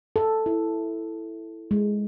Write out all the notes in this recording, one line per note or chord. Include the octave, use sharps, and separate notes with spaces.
A4
E4
G#3